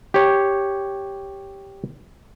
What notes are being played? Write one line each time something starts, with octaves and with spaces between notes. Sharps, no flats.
G4 C#5